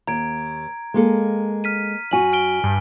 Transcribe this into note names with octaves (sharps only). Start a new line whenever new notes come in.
D#2 A#5 G#6 D7
G#3 A#3 A4
F6 B6 D#7
F#2 F#4 G#5 F#7
F6 D7 G7
G2